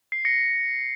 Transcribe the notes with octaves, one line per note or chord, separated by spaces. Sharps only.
C7
A#6 C#7